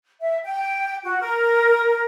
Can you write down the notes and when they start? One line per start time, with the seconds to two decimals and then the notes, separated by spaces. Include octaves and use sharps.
0.21 E5
0.44 G5
1.05 F#4
1.19 A#4